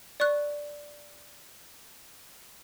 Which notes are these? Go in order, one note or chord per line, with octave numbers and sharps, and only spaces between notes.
D5 C#6 F#6